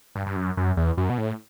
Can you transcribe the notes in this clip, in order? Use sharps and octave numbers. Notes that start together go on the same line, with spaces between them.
G2
G2
F#2
F#2
E2
F#2
B2
A2